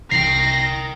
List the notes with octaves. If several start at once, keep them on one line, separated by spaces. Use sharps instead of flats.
C2 A#4 G5 A#6 C7 F#7